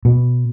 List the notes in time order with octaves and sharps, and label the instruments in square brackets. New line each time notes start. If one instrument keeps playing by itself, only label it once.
[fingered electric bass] B2